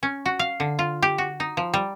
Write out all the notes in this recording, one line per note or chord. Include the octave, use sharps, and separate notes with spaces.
C#4
F#4
F5
D3
F4
G4
F#4
D#4
F3
G3